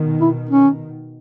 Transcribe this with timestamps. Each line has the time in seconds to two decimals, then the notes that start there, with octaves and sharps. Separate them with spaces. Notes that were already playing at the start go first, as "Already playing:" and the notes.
Already playing: B2 D#3
0.20 E4
0.50 C#4